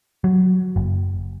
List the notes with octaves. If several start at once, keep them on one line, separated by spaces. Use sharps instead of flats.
F#3
F#1